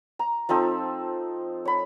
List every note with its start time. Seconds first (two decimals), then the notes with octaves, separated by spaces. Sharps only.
0.19 A#5
0.49 F3 C4 D#4 A4
1.65 C#5 B5